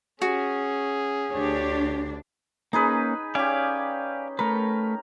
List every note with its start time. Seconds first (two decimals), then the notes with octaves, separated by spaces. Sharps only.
0.22 C#4 F#4 G#4
1.33 D2 D4 G4 C#5
2.73 A#3 C#4 D#4 G#4 B4
3.35 C#4 G4 D5 F5 G#5
4.39 A3 A#4 B4